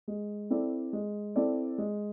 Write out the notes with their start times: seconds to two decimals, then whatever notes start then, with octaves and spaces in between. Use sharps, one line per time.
0.08 G#3
0.50 C4 E4 A4 D5
0.93 G#3
1.36 C4 E4 A4 D5
1.78 G#3